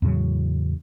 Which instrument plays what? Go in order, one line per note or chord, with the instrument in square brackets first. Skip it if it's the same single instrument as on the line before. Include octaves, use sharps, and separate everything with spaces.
[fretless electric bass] E2 A2 C#3 F#3